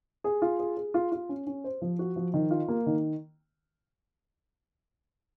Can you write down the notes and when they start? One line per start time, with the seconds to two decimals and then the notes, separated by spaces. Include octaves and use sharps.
0.24 G#4
0.42 F4
0.59 G#4
0.77 G#4
0.94 F4
1.12 F4
1.29 C#4
1.47 C#4
1.64 C5
1.82 F3
1.99 F#4
2.16 F3
2.34 D#3
2.51 F4
2.68 A#3
2.86 D#3